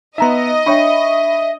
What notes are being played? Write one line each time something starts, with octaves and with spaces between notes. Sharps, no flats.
B3 D#4 D#5 E5 A#5 C6
D4 C#5 E5 G5 B5 C#6